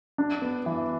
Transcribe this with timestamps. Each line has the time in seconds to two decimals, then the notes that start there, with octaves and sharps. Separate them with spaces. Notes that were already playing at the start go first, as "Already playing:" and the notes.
0.18 D4
0.42 B3
0.66 E3